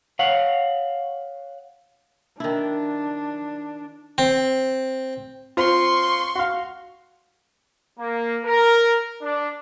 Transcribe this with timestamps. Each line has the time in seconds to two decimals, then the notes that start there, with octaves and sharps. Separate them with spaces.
0.19 C#5 F5 F#5
2.40 D#3 D4 E4
4.18 C4
5.57 C4 F4 C6 C#6
6.35 F#4 F5
7.99 A#3
8.45 A#4
9.22 D4